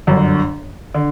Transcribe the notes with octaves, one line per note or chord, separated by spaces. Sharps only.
G1 F#2 D3
D3